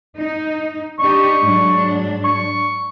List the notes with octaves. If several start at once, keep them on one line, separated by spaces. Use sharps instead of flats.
D#4
D4 D#4 G4 C#6
G#2 F#3 D4
C#6